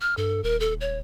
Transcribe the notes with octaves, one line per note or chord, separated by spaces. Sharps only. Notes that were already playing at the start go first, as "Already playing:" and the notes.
F6
G2 A4
D#1 A#4
A4
C#5